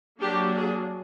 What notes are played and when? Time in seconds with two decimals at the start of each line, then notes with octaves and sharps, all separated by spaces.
0.20 F#3 A#3 D4 G4
0.56 G#4